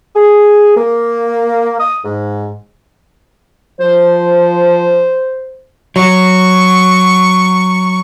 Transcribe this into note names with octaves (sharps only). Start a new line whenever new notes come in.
G#4
A#3
D#6
G#2
F3 C5
F#3 C#6